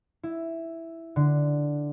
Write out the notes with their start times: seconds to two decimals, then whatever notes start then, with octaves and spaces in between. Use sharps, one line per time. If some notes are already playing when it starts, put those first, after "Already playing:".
0.23 E4
1.16 D3